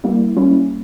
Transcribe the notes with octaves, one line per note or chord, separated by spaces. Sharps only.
G3 A#3 E4
G3 A#3 C#4 E4